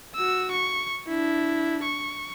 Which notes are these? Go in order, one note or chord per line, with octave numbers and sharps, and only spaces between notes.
F#4 E6
C#6
D4 E4
C#6